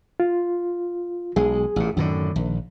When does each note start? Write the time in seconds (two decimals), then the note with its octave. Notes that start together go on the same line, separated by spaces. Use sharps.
0.20 F4
1.36 B1 G#3 G#4
1.76 A1 A#2
1.97 F#2 A2 D3 D#3
2.36 A#1